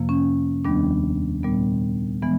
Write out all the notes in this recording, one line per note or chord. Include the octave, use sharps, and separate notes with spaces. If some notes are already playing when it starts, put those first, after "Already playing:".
Already playing: F2 C3 F3 A#3
C#4
D#2 D#3 G3 B3 D4
A#2 G3 B3
E3 G#3 B3